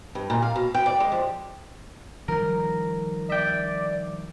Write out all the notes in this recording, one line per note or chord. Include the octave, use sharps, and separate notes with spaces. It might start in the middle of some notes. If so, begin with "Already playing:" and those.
G2
A#2
F5
B2
G5
D5
G#3
F3
D#3 F3 G3 A#4
D5 E5 G5